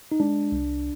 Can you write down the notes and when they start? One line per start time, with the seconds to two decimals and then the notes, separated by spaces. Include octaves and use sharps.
0.12 D#4
0.20 G#3 D4
0.52 C2